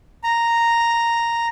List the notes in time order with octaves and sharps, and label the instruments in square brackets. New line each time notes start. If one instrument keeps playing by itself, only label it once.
[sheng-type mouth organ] A#5